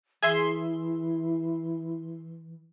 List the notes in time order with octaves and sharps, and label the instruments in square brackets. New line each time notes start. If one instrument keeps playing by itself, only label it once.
[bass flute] E3 [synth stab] G#4 E5 C6